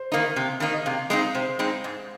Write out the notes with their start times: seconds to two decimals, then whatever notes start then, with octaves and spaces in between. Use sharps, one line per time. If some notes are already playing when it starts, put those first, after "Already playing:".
Already playing: C5
0.11 D#3 A#3 D#4 D#5
0.36 C3
0.60 D#3 A#3 D#4
0.73 D#5
0.86 C3 F5
1.10 G#3 C4 D#4 D#5
1.35 C3 C5
1.59 G#3 C4 D#4
1.84 G#2